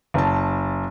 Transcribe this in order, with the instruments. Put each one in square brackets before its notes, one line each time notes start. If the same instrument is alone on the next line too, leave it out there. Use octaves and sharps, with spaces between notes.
[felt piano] F#1 A5